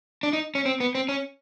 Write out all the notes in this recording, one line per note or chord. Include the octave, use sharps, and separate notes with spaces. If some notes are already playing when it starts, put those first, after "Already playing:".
D4
D#4
C#4
C4
B3
C4
C#4